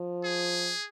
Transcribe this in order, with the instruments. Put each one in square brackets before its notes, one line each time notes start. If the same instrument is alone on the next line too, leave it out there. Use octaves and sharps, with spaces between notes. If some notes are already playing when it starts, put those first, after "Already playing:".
Already playing: [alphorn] F3
[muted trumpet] G#4